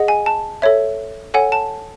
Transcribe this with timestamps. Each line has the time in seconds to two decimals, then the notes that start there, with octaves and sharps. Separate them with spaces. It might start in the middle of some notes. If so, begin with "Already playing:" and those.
Already playing: G#4 D#5 F#5
0.08 G#5
0.26 A5
0.62 A4 C#5 E5
1.34 A4 C#5 F#5 G#5
1.52 A5